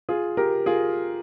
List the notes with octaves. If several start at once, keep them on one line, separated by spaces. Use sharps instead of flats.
F4 G#4
G4 A#4
F4 G#4